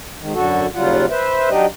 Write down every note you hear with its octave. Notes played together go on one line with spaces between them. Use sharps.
G#2 D#3
F#2 D3 F#4 A4
D#2 C#3 F#3 G3 F4 F#5
B4 C5 E5
F#3 D4 D#4 G4 D5 D#5